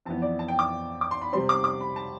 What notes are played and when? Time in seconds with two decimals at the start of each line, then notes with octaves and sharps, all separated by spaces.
0.05 F2 E3 B3 A5
0.22 D5
0.39 A5
0.48 G5
0.59 D6
1.01 D6
1.11 C6
1.22 B5
1.33 C3 G3 C4 C6
1.49 D6
1.64 D6
1.81 B5
1.96 A5